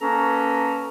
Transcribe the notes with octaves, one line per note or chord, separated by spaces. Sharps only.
A#3 C#4 A4 B4 A#5